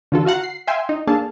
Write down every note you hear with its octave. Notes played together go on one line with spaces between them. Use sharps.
D3 E3 F4 F#4 A4
F4 F#4 F5 F#5 A#5
C7
E5 F5 G5 G#5 C6
D#4
A#3 D4 G#4 A4 F5 A5